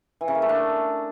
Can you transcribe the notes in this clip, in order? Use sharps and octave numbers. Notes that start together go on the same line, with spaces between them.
E3
C#3
A#3
A3
D4